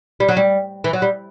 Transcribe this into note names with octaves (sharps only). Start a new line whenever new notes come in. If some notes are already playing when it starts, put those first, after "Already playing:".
G3
F#3
G3
E3
F#3
G3